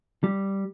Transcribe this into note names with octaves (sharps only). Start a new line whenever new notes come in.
G3